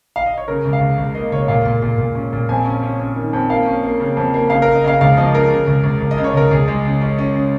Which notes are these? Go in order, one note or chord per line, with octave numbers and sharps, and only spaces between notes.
F5
D#5
C#5
C#3 A#4
C#2
F5
C#2
C#2
A#3 D#5
C#2 C#5
A#2 F5
A#2
A#2
A#2
C#4
A#2
F2 G#5
C#4
C#4
C#4
D#3
F2
A#3 F5
C#4
A#3
C#3
F2
A#3
C#3 F5
C#3 A#4
D#5
C#3 F5
C#2 F5
F3 D#5
C#3 A#4
C#3
C#2
C#2
C#2
D#5
C#3
C#5
C#2 A#4
C#2 G#4
G#3
C#3
C#4
C#4
C#3